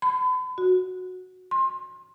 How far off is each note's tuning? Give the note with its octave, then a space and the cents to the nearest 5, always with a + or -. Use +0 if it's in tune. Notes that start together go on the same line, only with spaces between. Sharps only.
B5 +40
F#4 -5
C6 +25